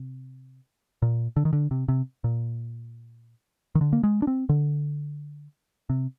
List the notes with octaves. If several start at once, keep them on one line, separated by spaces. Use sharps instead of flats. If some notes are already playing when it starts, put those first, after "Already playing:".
Already playing: C3
A#2
D3
D#3
D3
C3
C3
A#2
D#3
D3
A#3
G#3
D4
C4
D3
C3